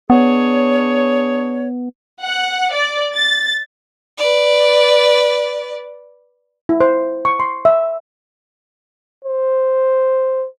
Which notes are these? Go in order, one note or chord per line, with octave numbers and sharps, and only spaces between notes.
B3 D4 G#4 C#5
F#5
D5
A6
B4 D5
E4
C5
C#6
C6
E5
C5